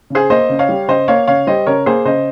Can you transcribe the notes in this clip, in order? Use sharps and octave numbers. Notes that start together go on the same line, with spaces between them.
C#3 G#4 C5
A#3 C5 D#5
C#3
C#5 F5
G3
C#3 C5 D#5
A#3 C#5 F5
C#3 C#5 F5
G3 C5 D#5
C#3 A#4 C#5
A#3 G#4 C5
C#3 C5 D#5